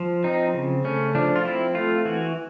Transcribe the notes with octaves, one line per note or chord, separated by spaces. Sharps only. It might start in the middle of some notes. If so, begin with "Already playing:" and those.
Already playing: F3
C4 D#4
C#3
A3 C#4
F3 D4
F4
C4 E4
A3 F4
E3 F#4